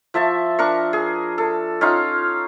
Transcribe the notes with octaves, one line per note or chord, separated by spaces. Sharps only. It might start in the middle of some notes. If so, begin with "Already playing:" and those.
F3 E5 A5 C#6
D4 A#4 C#6
G#4
A4
C#4 D#4 F4 F5